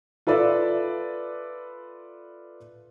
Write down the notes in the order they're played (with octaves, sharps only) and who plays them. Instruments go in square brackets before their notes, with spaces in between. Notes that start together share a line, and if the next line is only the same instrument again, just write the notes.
[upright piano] F4 A4 B4 D5 E5